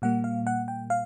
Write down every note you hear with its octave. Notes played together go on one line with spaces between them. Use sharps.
A#2 G3 A#3 F#5
F5
F#5
G5
F5